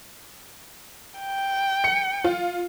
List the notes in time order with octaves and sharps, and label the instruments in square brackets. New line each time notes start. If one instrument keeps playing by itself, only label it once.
[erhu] G5
[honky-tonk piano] C#7
F4